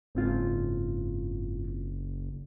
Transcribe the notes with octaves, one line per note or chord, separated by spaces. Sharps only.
F#1 G#2 C4 F4